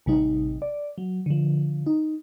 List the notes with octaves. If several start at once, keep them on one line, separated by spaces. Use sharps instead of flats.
A1 C3 G3 D#4
D5
F#3
D3 F3
D#4